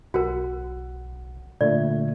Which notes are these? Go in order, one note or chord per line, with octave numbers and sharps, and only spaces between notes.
B1 F#4 A#4 F#5
A#2 D3 A3 D5